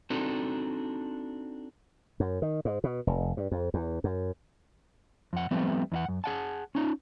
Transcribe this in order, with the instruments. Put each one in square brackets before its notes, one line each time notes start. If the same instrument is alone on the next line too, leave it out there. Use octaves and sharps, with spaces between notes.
[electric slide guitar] C4 D4 D#4 F#4 A4
[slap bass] F#2
D#3
G#2
B2
F1
G2
F2
E2
F#2
[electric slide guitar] F2 F#5
F3 G3 A3 B3 C4
E2 D#4 F#5
F#2
G#4 F#5 A5
C#4 D#4 F4